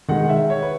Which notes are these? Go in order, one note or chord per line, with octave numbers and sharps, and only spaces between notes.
D#3 G#3 D#4 F#5
E5
C#5
B4